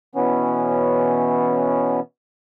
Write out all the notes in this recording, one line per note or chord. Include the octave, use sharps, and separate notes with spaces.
B2 E3 B3 C#4